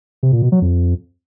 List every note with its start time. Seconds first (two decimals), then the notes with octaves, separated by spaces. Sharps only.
0.23 C3
0.32 A#2
0.42 B2
0.52 F#3
0.62 F2